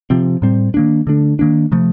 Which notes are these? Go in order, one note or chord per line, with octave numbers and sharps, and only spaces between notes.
C3 F3 C4
A2 G3 C4
D#3 A#3 D4
D3 A3 D4
D#3 A#3 D4
C3 F3 A3